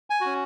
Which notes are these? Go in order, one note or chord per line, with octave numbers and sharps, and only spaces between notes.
G#5
C#4 F#4